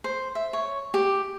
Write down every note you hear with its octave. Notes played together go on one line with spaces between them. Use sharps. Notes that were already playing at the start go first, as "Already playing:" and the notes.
C5
E5
C#5
G4